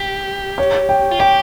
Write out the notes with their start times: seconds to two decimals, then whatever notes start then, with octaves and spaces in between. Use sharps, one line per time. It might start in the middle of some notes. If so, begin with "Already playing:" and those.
Already playing: G4
0.58 C#5
0.89 G5
1.11 F4
1.19 G4 G5